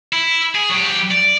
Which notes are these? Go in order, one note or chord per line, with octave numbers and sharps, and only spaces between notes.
E4
G#4
F#3 G4
D5